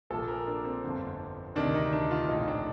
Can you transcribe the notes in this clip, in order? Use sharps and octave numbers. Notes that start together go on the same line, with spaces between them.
A#1 A#2 F3 A4
A#4
D4
C4
G1 F2 D3
D2 C3 D#3 D4
D#4
D4
F4
A#1 A2 F3 D#4
D4